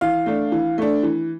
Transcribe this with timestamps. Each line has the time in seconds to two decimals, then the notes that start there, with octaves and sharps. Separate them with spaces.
0.01 E3 F5
0.26 A3 D4
0.52 E3
0.78 A3 D4
1.03 E3